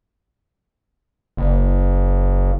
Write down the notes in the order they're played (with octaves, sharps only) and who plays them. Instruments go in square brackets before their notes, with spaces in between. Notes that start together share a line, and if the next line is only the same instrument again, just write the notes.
[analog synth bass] F#1